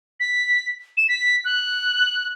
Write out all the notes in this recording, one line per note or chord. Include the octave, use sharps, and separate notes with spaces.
B6
E7
B6
F#6